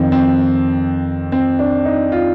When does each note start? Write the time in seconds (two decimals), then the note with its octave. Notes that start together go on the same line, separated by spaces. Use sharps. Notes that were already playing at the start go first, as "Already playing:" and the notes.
Already playing: F2 D#3 C4
0.12 C4
1.32 C4
1.59 D4
1.85 D#4
2.12 F4